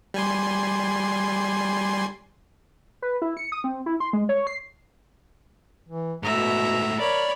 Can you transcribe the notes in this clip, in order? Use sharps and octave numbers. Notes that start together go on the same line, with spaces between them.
G3 G#5 C6
B4
E4
C#7
D#6
C4
E4
C6
G#3
C#5
C7
E3
G#2 B2 A3 E5 A#5
A#4 C#5 D5 B5